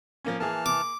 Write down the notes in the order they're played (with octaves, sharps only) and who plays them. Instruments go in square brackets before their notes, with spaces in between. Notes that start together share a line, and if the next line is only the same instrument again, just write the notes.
[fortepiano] F3 A#3 C#4
[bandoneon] E3 A5 F6 [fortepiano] A#3 G#4
[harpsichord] D6